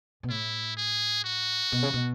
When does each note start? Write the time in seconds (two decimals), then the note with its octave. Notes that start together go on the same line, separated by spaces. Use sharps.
0.23 B2
0.30 A2 E4
0.77 G#4
1.24 F#4
1.72 B2
1.83 C#3
1.93 B2